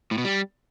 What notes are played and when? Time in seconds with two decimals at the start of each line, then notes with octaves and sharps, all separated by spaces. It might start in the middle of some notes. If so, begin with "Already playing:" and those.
0.11 A2
0.18 B2
0.24 G3